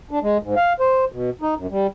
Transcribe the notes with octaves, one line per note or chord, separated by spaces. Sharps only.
D4
G#3
G#2
F5
C5
B2
D#4
F#2
G3